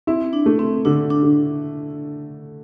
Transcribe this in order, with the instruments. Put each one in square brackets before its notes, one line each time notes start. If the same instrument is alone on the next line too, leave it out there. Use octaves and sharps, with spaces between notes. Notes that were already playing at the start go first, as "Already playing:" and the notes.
[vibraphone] C4 [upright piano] E4
[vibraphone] D4
[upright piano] A3
[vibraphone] C4
[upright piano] D3 [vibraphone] D4
[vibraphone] D4
[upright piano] D3